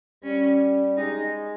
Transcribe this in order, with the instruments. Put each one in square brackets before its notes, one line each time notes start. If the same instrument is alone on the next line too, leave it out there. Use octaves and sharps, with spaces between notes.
[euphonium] G3 [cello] C#4
[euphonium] G#3 [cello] D#4